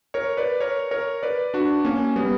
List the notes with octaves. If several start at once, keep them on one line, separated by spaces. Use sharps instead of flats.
A#4 C#5
B4 D5
A#4 C#5
A#4 C#5
B4 D5
D4 F#4
A#3 C#4
G3 B3